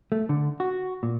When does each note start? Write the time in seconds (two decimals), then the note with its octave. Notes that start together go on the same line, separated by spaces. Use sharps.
0.12 A3
0.29 D3
0.60 F#4
1.03 A#2